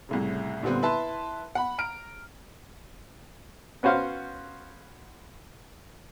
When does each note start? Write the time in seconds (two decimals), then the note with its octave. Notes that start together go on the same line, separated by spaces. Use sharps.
0.09 C2 A2 C#3
0.63 A#2 D3 G3 B3 C4
0.82 E4 B4 E5 A5 C6
1.55 F#5 B5
1.78 A#5 F6 D7
3.83 B3 C#4 F#4 C5 F5